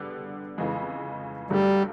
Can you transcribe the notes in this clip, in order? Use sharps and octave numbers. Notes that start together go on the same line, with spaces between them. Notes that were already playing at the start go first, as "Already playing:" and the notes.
Already playing: D3 G3 B3
F2 C#3 E3 G#3
G2 D3 F#3 G3 A3